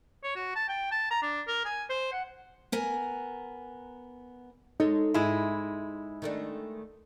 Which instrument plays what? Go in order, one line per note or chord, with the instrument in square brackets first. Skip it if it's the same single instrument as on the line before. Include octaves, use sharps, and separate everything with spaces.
[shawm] C#5
F#4
A5
G5
A5
A#5
D4
A#4
G#5
C5
F#5
[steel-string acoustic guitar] B3 A#4 G#5 A#5
[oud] G#3 A4 C#5 [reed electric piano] D#4
[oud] G#2 [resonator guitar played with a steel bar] G#3 E4
[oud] D#3 A3 D4